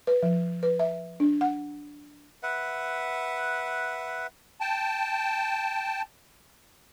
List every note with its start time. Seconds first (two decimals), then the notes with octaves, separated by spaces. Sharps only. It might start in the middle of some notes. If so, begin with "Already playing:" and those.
0.07 B4
0.23 F3
0.63 B4
0.79 E5
1.20 D4
1.41 F#5
2.43 B4 E5 F#5
4.60 G5 A5